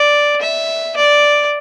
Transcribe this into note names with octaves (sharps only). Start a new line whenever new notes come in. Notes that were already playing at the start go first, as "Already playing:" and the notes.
Already playing: D5
E5
D5